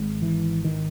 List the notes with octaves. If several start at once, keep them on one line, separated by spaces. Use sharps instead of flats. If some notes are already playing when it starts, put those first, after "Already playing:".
Already playing: G#1 G#2
E3
D#3